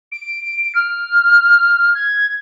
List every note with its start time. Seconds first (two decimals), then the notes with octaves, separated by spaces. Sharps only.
0.12 D7
0.75 F6
1.95 G#6